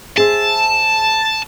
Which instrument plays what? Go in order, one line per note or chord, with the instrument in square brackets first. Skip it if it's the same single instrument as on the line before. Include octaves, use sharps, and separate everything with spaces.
[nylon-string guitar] G#4 C5 E5 [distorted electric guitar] A5